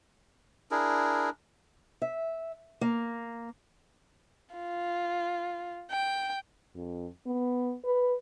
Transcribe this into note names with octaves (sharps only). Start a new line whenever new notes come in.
D4 E4 G#4 A#4
E5
A#3
F4
G5
F2
B3
B4